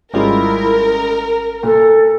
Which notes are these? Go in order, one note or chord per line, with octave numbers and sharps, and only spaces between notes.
G#1 G3 G#3 C#4 E4 F4 A#4
A#5
A#2 A4